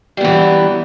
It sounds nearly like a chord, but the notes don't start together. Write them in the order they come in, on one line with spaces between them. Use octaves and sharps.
G3 B3 E3 F#2